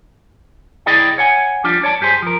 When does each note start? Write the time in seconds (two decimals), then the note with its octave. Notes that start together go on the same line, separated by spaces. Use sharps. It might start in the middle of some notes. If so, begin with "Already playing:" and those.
0.86 C2 E4 G#4 D5 D#5 G5
1.18 C#5 F#5 G#5
1.64 F3 G3 D4 F4
1.84 C#5 D5 A5
2.01 G2 G4 G#4 C5
2.22 F3 A#4